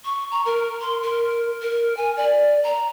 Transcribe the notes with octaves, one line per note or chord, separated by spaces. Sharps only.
C#6
A#5
A#4
C6
A#4
A#4
G#5
D5
A#5